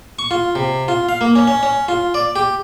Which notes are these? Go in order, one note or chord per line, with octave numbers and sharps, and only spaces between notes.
C#6
F4
C3
F4
F5
A#3
C#4
C#4
C#4
F4
D5
G4